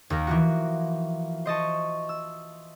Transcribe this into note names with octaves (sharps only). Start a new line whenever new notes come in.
D#2 D#3 A#4
E3 F3 F#4
C5 D#5 A5 C#6
E6